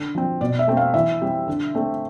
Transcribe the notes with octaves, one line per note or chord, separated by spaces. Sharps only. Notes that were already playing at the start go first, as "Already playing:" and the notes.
Already playing: D3
F3 C4
B2 D5
E5
A3 C4
F5
E3 E5
G3 C4
D3
A3 C4